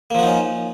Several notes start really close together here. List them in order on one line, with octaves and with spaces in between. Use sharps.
A#3 F3 F#4 D#4 C#4